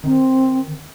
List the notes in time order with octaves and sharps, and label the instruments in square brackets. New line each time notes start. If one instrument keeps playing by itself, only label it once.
[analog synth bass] D#3 [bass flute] C4